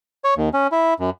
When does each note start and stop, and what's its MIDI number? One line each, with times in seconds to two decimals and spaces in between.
0.24 0.34 73
0.37 0.49 39
0.54 0.67 61
0.72 0.94 64
0.99 1.10 42